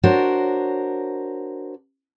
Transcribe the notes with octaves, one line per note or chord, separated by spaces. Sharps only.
D4 F#4 A#4 C5 C#5